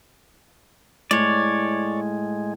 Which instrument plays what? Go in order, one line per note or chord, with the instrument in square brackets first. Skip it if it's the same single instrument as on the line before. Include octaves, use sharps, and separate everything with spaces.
[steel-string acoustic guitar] A2 [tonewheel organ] G#3 [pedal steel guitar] C#5 D5